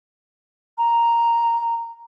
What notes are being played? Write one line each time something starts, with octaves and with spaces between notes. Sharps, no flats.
A#5